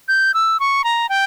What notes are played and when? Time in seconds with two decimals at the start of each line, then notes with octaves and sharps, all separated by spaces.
0.08 G6
0.34 E6
0.60 C#6
0.84 A#5
1.09 G5